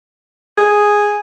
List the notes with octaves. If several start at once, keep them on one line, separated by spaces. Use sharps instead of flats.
G#4